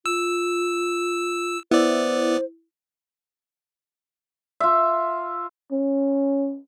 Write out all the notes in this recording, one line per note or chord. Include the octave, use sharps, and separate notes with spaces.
F4 E6
B3 E4 C5 D5
F4 E5
C#4